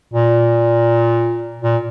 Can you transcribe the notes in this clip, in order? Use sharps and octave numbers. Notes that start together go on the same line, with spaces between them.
A#2
A#2